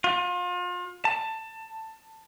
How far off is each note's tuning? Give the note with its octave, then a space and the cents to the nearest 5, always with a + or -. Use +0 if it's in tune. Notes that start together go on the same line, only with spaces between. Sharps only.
F4 +35
A5 +15